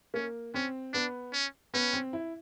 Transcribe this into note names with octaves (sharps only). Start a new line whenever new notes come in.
A#3 C#4
C4 C#4
B3 D4
C#4
B3 C#4
C4
E4